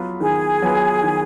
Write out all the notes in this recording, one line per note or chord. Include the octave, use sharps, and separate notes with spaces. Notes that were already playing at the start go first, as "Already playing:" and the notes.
Already playing: F#3 B3 F4 B4
D#3 G#4 G#5
F#3 B3 F4 B4
D#3